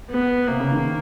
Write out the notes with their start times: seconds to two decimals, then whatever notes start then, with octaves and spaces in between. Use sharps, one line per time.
0.10 B3
0.48 C3 A#3
0.60 C#3
0.72 D#3